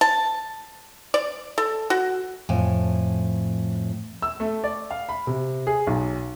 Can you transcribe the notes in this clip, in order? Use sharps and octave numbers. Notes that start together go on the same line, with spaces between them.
A5
D5
A4
F#4
F2 A2 G#5
E6
A3
D5
F5
B5
C3
G#4
B1